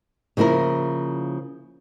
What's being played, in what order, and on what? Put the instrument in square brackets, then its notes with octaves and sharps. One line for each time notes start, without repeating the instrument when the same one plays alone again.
[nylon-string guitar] C#3 F3 A#3 E4 A#4